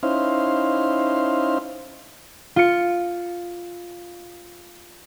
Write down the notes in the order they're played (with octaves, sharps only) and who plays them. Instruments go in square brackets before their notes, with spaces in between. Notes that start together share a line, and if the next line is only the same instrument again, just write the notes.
[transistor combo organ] C#4 D#4 E4 C5 F5
[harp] F4 C#7